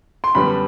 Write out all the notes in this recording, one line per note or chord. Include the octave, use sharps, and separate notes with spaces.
C6
F#2 D3 G3 B3 B5